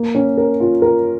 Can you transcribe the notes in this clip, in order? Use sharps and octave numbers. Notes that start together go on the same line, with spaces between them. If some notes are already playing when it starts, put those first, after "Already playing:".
Already playing: A#3
C#4
A#4
F4
A#4